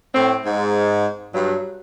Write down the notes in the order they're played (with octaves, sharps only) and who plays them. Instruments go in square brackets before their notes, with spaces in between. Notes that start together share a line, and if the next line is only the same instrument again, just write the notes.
[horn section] A2 [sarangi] C4
[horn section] G#2
[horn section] G2 [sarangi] F#3